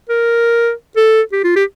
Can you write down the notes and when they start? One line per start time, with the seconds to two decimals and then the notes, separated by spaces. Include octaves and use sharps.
0.09 A#4
0.97 A4
1.32 G4
1.44 F4
1.56 G4